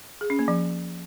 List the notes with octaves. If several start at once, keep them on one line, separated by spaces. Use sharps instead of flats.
G#4
C#4
A#3
F3